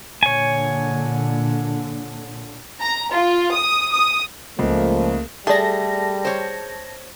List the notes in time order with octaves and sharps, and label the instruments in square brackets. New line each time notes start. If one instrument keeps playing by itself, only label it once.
[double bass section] A#2 D3 [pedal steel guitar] C#5 G#5
[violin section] A#5
F4
D#6
D#6
[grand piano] C#2 [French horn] F3 [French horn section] A3 A#3
[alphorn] G3 [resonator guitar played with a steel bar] A3 [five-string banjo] G#4 D5 [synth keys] A5 A#6
[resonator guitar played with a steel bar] C5 C#5